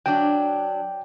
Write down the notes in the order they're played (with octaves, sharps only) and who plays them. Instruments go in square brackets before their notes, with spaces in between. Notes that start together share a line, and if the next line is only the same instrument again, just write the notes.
[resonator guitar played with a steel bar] F#3 D4 [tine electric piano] G5